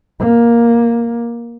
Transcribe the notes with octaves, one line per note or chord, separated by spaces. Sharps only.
A#3